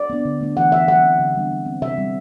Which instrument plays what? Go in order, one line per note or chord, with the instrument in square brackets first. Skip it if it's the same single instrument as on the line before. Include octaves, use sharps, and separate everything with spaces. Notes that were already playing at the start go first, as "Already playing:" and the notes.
Already playing: [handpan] D5
B3 D4
D3
A3 D4
E3 F#5
B3 D4 E5
F#3 F#5
C4
D3
G3 B3 D4
F#3
C4
C3 E5
G3 C4